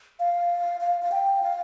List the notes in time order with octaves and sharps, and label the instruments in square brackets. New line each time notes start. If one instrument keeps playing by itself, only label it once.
[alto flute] F5
F5
F5
G5
F5